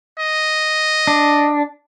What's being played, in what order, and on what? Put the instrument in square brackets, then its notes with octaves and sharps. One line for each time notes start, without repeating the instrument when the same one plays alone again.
[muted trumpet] D#5
[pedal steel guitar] D4